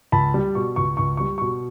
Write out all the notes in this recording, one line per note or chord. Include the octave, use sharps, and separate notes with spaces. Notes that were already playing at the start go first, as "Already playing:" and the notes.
C#2 A5 B5
G3
B2 C#6
C#2 C#6
C#2 C#6
G3 C#6
B2 C#6